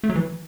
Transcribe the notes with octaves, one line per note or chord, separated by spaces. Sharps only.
A3
F#3
E3